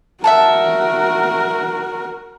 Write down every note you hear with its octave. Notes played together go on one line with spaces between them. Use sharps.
F#4 A#4 E5 F#5 A5